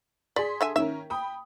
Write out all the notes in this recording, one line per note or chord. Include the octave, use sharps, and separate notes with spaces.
G#4 D5 C6 B6
D3 E5 G#5
D#3 C#4 A#4 E5
G5 B5 D#6